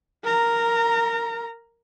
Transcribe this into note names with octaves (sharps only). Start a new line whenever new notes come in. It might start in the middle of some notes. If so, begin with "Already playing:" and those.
A#4 A#5